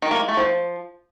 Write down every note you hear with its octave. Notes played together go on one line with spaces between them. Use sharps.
D#3
A#3
G#3
A3
F3